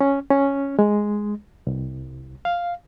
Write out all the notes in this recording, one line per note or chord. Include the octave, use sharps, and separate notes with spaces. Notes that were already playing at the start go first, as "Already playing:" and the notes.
C#4
C#4
G#3
C2
F5